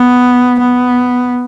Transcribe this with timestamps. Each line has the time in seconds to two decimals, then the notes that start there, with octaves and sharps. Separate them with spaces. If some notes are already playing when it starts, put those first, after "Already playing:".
Already playing: B3
0.59 B3